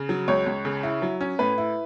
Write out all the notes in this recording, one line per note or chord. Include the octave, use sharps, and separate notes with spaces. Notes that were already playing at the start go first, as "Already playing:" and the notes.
Already playing: C#3
F#3
C#2 C#5
C#2
C#3
E4
F#3
C#4
A2 B4
E4